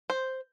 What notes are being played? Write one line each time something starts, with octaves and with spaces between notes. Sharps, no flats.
C5